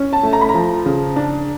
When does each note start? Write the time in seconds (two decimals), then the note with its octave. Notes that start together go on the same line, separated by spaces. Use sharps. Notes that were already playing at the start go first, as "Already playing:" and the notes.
Already playing: C#4
0.13 A5
0.23 A3
0.33 A#5
0.41 B5
0.49 A#5
0.54 F3
0.86 C#3
1.16 D4